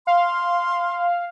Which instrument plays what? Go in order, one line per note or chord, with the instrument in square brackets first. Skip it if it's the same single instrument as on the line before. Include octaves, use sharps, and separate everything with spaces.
[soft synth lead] F5 [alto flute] C6